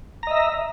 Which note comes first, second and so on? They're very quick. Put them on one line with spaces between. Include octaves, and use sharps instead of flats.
A#5 D#5 E5